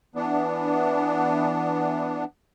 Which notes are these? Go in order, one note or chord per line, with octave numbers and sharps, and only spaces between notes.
E3 B3 D4